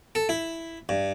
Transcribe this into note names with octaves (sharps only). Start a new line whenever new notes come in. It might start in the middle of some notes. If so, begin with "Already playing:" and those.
A4
E4
G2